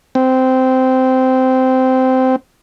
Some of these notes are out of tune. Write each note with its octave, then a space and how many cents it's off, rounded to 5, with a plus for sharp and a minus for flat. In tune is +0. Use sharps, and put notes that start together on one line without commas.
C4 -15